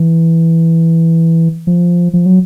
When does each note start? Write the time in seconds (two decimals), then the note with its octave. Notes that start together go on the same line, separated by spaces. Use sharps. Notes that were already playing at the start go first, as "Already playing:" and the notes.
Already playing: E3
1.67 F3
2.13 F3
2.26 F#3